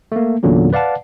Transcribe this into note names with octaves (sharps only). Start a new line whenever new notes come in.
A3 A#3
E2 A#2 D3 F#3 C#4
B4 D5 F5 F#5 A5